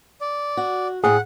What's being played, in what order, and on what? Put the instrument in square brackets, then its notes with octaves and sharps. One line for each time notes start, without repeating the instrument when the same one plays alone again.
[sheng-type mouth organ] D5
[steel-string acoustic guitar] F#4
[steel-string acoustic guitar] A2 A3 G5 [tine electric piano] G#4 [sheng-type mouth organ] F#5